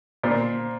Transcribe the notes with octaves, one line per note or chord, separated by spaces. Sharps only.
A#2 C5